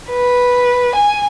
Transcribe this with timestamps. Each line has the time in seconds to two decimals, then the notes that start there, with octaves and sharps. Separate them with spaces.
0.11 B4
0.96 G#5